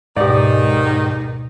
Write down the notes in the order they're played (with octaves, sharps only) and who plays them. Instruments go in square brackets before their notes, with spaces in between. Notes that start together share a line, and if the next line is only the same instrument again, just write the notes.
[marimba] D2 B2 [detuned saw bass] G#2 [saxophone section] D#3 D#4 [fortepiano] G4 D5